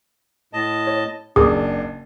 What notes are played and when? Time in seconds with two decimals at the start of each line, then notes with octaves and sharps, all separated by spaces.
0.53 A2 D#5 A5
0.87 C#5
1.36 F#1 D4 G#4 D6 D#6